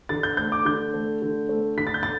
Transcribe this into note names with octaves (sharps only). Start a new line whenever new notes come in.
D3 A6
G6
A3 G6
D6
D3 G6
A3
D3
A3
D3 B6
A6
G6
A6